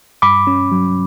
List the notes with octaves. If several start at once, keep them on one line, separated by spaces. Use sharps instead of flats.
G2 B5 D6
C#4
F#3